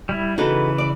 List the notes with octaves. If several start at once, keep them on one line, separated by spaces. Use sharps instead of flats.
G3 E4
C#3 E3 D#4 F#4 A4 B4
D5